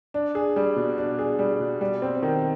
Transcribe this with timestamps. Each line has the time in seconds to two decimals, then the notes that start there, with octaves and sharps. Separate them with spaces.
0.14 D4
0.35 G#4
0.56 G3
0.76 B2
0.98 D4
1.19 G#4
1.39 G3
1.60 B2
1.81 G3
2.02 C4
2.23 D#3